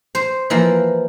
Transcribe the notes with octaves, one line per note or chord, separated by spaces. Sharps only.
C5
E3 F3 A#3